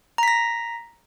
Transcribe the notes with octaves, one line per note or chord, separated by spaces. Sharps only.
A#5 A#6 B6